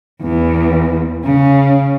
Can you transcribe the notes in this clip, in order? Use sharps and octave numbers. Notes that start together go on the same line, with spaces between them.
E2
C#3